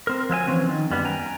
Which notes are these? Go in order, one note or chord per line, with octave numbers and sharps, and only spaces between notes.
C4 A#4
F3 F#3 E5 G#5
E3 F3 C4 C#4
D#3
F#2 G3 B3
G5 G#5 A#5